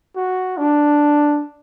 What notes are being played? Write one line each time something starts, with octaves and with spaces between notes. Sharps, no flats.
F#4
D4